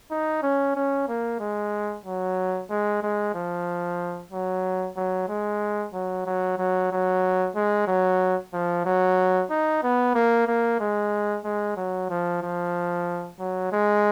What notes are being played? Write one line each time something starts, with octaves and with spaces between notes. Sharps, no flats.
D#4
C#4
C#4
A#3
G#3
F#3
G#3
G#3
F3
F#3
F#3
G#3
F#3
F#3
F#3
F#3
G#3
F#3
F3
F#3
D#4
B3
A#3
A#3
G#3
G#3
F#3
F3
F3
F#3
G#3